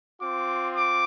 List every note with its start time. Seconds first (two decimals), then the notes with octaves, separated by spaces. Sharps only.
0.19 C4 F4 D6
0.73 D6